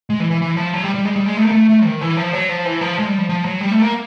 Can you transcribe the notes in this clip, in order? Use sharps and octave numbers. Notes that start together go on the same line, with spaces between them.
G#3
E3
E3
E3
F3
F#3
G3
G3
G#3
G3
G#3
A3
A#3
A3
A3
D#3
E3
F3
F#3
F3
E3
F3
G#3
G3
F3
F3
F#3
G3
A3
A#3